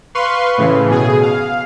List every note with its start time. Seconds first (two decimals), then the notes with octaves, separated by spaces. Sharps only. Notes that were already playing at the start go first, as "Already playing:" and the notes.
0.15 B4 F5 C6 C#6
0.58 A2 C#3 E3
0.90 B2 G#4
1.23 F5